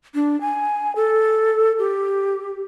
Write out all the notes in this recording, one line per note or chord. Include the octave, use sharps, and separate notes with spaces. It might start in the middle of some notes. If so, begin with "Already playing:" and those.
D4
G#5
A4
G4